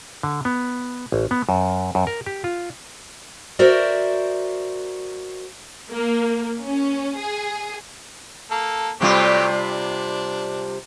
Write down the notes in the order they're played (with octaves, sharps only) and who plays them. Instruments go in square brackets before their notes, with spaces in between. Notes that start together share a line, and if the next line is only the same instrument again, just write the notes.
[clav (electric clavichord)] D3
B3
A1
B3
F#2
F#2
A#4
G4
F4
[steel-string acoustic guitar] F#4 A#4 C5 D5 E5
[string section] A#3
C#4
G#4
[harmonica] A#3 A4
[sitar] C3 G3 F4 [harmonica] F#3 A3 G4
[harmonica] D4